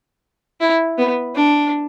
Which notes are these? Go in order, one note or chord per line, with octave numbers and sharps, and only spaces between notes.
E4
B3
D4